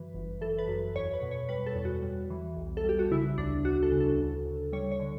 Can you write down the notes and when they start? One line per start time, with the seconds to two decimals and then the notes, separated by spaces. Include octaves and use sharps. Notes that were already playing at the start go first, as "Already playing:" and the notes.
Already playing: F#2 E3 B4
0.14 G1
0.41 E3 A4
0.59 B4
0.68 F#2
0.95 E2 C#5
1.14 B4
1.22 B2
1.31 C#5
1.49 G3 B4
1.66 A4
1.76 E2
1.85 F#4
2.02 G3
2.30 E3
2.56 B1
2.77 A4
2.84 G3 G4
2.99 F#4
3.11 C#3 E4
3.38 D2 D4
3.65 D2 F#4
3.83 A4
3.92 C#3
4.00 A4
4.18 D2
4.46 D2
4.73 G3 C#5
4.92 C#5
4.99 D3